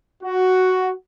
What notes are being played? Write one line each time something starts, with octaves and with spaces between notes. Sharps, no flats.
F#4